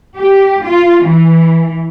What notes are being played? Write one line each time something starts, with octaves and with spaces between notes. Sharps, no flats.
G4
F4
E3